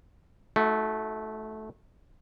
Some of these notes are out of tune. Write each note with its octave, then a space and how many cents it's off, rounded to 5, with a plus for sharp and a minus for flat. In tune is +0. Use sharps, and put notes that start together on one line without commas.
A3 -15 D#4 +40 F#4 +0